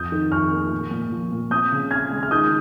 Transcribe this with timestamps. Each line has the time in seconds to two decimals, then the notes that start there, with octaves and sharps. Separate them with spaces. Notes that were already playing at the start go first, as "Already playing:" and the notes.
Already playing: F2 D#6 G6
0.12 D#3
0.31 F2 C#6 F6
0.52 A#3
0.72 A#2
0.91 A#2
1.12 F3
1.32 A#2
1.51 C4 D#6 G6
1.72 C#3
1.91 C4 F6 G#6
2.11 G#3
2.23 F6
2.31 D#3 D#6 G6